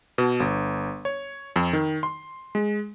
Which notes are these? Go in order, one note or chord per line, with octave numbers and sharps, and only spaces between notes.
B2
G1
C#5
F2
D#3
C6
G#3